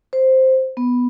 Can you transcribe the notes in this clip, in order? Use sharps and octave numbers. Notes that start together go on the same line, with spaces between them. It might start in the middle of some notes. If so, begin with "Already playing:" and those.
C5
B3